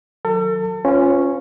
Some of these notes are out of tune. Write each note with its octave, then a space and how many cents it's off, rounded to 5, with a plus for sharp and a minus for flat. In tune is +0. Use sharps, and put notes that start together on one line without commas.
D#3 +0 F#3 -20 A4 +35
C#4 -5 F4 +0 B4 +40